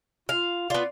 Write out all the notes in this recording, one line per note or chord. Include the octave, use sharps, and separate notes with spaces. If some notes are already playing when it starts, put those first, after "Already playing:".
F4 F5
B3 F4 D5